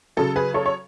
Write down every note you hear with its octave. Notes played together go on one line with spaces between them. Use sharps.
C#3 F#3 A4
G#4 B4
A4 C#5
C#5